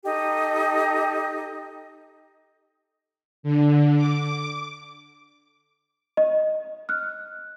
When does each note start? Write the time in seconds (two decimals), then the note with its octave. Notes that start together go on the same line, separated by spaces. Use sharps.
0.04 D#4 G4 A4 D#5
3.43 D3
3.97 D6
6.17 D#5
6.89 F6 F#6